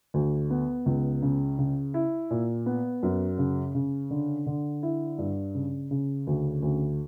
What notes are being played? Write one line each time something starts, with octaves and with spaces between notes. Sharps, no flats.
D2
B3
C#2
C#3
C#3
E4
A#2
B3
F#2
C#3
C#3
D3
D3
E4
G2
C#3
C#3
D2
D2